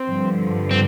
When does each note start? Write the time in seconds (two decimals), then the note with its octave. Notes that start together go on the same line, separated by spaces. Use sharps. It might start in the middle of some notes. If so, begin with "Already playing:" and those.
Already playing: C4
0.08 G2 D3 F3
0.71 C4